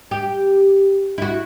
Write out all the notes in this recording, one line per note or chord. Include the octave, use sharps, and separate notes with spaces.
G4
E4 F#4